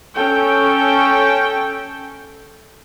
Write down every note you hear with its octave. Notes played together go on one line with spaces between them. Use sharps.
C#4 A4 G5